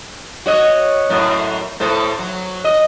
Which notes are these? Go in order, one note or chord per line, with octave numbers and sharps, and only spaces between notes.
F#4 C#5 D#5
F#2 A2
A2 A4 C5
F#3
D#5